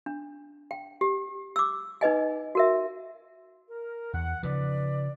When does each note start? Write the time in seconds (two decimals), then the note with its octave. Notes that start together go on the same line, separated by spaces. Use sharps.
0.06 D4
0.71 G5
1.01 G4
1.56 D6 E6
2.01 D#4 B4 D#5 G#5
2.55 F#4 A#4 E5
3.68 A#4
4.13 E2 F#5
4.43 C#3 F3 B4 D5